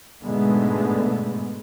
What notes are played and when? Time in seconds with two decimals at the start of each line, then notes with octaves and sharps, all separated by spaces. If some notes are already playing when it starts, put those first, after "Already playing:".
0.23 G#2 B2 D3 G#3 A3 B3